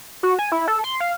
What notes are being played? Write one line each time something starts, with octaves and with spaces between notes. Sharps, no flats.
F#4
G#5
E4
A4
C6
F5